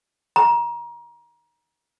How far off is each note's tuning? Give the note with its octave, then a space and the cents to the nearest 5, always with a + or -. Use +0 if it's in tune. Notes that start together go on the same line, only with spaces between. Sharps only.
A#5 +25